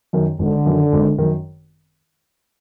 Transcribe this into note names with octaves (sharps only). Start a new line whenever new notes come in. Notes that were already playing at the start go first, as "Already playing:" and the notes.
F#2 D#3
G#1 D3
F#2 D#3
G#1
F#2 D#3